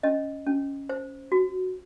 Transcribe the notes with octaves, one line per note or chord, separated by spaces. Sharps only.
C#4 D#5
C#4
C5
F#4